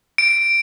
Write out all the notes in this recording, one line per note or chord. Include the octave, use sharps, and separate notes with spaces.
D7